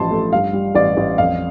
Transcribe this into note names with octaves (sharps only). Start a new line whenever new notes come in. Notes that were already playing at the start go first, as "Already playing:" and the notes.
Already playing: A1 G2 F3 A5 C6
A3
G2 F5
G3
A1 D5
A1
F2 F5